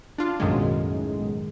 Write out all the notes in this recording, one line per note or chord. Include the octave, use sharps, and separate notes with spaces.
D4 F4
B1 F#2 A2 D#3 G#3